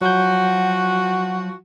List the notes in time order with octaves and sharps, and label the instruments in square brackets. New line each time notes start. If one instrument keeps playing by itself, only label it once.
[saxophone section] F3 F#4 [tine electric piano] F#3 G6 [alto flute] F#5